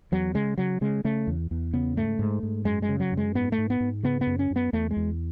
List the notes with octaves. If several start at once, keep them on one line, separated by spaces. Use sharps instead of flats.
E2 F#3
C#3 G#3
C#3 F#3
C#3 G#3
C#3 A3
E2
E2
C#3 B3
G#2 A3
G#2
G#2
F#2 G#3
G#3
C#3
F#3
F#2
G#3
G#2 B3
A3
G#2
B3
G#2
C#3 B3
B3
F#2
C#4
F#2
B3
E2 A3
G#3
E2